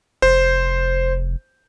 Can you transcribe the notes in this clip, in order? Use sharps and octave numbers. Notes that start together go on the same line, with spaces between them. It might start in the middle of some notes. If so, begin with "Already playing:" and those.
F1 C5